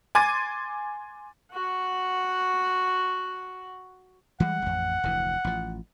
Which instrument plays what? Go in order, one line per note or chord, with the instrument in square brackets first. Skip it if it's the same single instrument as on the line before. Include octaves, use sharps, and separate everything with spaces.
[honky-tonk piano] G#5 C6 D6 G#6 A6 D#7
[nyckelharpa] F#4 F#5
[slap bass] E3 G3 G#3 [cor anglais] F#5
[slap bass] A1 F2
F1 D2 E3
A1 F3